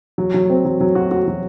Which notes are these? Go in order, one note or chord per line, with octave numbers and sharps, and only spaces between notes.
F#3
F#3
C4
F#3
F#3
F#4
F#4
F#3